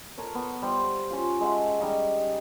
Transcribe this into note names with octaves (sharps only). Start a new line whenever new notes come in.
A4 A#4 C#5
B3
G3 C5
C#4 F4
G#3 E5 F#5 A5
G3 D#4 F5